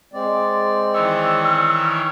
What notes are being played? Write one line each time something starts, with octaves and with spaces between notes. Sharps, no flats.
G#3 C4 D5
D#3 E3 C#5 E6